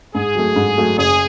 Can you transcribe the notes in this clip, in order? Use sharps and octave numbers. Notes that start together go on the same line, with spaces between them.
G#2 G#4
F#3 A3
G#2
F#3 A3
F#1 G#4